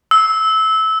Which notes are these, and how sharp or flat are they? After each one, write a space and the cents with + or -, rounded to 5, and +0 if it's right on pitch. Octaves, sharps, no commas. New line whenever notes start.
E6 -20